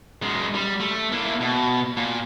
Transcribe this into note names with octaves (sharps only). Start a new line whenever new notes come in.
F#2 G#3
G3
A3
A#3 E4
B2
A#2